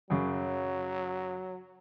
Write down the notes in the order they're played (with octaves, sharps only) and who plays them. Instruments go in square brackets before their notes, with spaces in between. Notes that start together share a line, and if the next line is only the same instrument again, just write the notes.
[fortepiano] F#2 C#3 [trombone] F#3